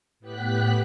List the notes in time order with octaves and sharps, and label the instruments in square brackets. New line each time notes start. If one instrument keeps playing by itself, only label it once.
[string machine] A2 B3 G4 F#6 B6